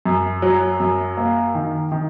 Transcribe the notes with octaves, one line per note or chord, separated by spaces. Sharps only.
F#2
F#3
F#2
A#3
D#3
D#3